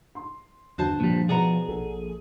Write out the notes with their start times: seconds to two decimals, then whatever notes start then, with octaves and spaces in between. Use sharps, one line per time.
0.15 C6
0.78 G1 E2 F#4 C5 A5
1.00 A#2 F3 G3
1.29 B2 G#4 D5 F#5 A#5
1.69 A#1 A4